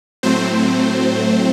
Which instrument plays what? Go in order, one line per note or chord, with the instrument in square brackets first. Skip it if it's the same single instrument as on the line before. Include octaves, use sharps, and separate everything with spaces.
[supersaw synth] A2 F#3 A3 C4 C5